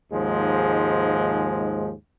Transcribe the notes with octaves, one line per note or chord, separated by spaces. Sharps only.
D#2 G#2 F3 G#3